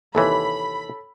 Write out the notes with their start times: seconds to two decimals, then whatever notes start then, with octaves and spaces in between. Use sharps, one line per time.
0.15 D#2 C3 E3 A4 C#5 B5